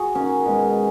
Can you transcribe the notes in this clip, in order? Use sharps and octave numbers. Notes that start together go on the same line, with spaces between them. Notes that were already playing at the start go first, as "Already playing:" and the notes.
Already playing: F#4 G#4
D#3 A#3 C#4
B2 G#3